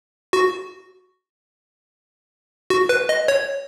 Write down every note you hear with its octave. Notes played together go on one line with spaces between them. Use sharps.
F#4
F#4
B4
D#5
C#5